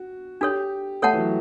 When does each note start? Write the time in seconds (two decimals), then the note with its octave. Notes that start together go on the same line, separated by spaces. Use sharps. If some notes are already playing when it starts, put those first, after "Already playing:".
Already playing: F#4
0.41 D4 G4 A4 C#5
1.02 A3 A4 C#5 F#5 A5
1.13 E3
1.18 F#3